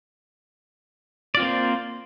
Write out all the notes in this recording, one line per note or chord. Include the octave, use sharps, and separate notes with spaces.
A#3 C4 F4 C5 D5